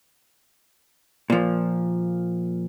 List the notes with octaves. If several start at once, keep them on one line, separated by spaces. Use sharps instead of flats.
A#2 F3